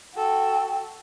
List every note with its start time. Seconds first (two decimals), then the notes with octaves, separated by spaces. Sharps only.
0.16 F#4 A4 G5